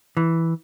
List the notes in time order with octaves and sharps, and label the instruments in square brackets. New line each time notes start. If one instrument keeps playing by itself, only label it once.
[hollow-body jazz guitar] E3